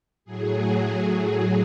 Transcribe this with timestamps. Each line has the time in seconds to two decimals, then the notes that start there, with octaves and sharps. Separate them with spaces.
0.25 A2 F#3 G#4
1.04 G#4